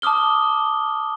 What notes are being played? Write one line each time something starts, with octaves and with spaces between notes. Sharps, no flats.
A5 D6 D#6 F6 G7